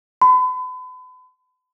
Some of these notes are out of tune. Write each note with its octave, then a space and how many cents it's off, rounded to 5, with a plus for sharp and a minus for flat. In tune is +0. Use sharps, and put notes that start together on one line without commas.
B5 +40